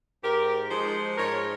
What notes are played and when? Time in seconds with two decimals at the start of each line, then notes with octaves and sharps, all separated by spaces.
0.23 G#2 G4 A#4
0.70 F3 G#3 D#4 G#4 C5
1.17 G#2 A#4 C#5